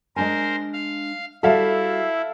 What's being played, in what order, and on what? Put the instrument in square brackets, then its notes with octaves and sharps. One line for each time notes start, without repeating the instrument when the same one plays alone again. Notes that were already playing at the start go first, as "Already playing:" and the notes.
[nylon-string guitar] G#3 D4 G#5 [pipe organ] A#4 C5
[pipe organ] F5
[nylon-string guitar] G3 F#4 [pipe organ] E4 [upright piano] A4 E5 F5